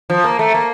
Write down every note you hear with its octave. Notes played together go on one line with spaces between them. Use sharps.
F3
A#3
A3
A#3